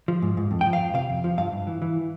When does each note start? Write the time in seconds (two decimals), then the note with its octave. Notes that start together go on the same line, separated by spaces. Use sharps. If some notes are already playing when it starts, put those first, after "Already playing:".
0.08 F3
0.22 G#2
0.37 G#2
0.51 F2
0.61 G5
0.66 F3
0.73 F5
0.80 F2
0.94 C3 F5
1.10 F2
1.24 F3
1.38 G2 F5
1.52 G2
1.67 E3
1.82 E3